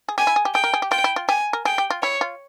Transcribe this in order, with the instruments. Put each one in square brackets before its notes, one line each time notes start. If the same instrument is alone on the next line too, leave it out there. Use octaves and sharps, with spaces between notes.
[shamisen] G#4
[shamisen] G4 [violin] G#5
[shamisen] E4
G#4
G4
[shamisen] G#4 [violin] G5
[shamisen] A#4
G#4
G4
[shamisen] F4 [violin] G5
[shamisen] E4
F4
[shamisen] G4 [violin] G#5
[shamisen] A#4
[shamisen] G#4 [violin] G5
[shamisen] G4
F4
[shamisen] E4 [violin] C#5
[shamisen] F4